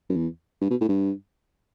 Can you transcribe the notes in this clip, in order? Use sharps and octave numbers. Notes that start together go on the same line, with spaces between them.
F#2
E2
G2
B2
A2
G2